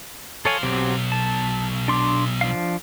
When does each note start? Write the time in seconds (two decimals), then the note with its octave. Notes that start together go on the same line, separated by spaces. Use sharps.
0.45 A4 C5 C#5 F5 G#5
0.63 B1 F#3 C4 G4
1.12 A5
1.88 D4 C6 D6
2.41 F3 D4 F5